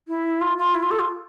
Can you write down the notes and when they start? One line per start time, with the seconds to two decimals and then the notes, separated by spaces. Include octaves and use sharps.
0.08 E4
0.41 F4
0.58 F4
0.75 E4
0.83 F4
0.91 A4
0.99 F4